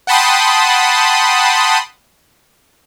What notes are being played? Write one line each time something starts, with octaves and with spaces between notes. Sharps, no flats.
F#5 G5 A5 B5 C6 D#6